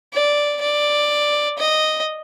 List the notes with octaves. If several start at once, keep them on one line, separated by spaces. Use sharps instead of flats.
D5
D5
D#5